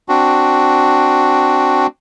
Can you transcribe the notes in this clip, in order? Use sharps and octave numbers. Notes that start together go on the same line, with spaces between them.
C4 D4 F#4